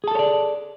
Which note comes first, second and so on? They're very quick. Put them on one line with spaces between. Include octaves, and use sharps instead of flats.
G#4 A5 A4 C#5 D5